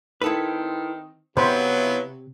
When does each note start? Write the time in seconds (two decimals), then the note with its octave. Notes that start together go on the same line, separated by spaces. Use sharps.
0.22 D#3 C4 E4 A4 B4
1.37 C3 F3 F#3 B3 E4 C5 B5